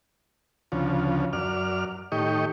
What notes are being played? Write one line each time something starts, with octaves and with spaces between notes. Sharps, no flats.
D2 C#3 F3
F#2 D5 F6
A2 D#3 G4 D#5 C#6